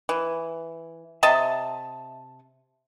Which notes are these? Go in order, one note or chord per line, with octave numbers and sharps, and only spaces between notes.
E3
C3 D#5 E5 A5